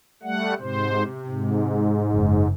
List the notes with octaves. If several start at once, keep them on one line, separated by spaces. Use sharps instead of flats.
G3 A3 F#5
G#2 C3 C5
G#2
F#1